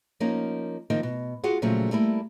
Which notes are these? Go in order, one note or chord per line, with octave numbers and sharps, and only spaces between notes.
F3 A#3 C#4 D#4
D#3 F3 A#3 C4 D#4
B2
F4 F#4 G#4 F#5
A#2 C#3 F3 F#3 A3 C4
G3 A3 A#3 E4